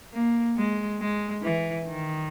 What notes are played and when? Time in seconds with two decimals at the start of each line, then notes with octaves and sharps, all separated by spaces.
0.13 A#3
0.57 G#3
1.01 G#3
1.43 E3
1.87 D#3